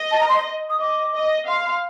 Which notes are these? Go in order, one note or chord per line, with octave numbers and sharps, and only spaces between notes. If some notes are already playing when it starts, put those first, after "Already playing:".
Already playing: D#5
A5
A#5
C6
D#6
D#5 D6
D#5
F5 C6
C6